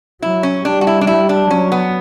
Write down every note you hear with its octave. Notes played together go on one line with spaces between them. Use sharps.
F#3 E4
C#4
G3 D4
F#4
E4
D4
G3 E4
D4
F#3 C#4
B3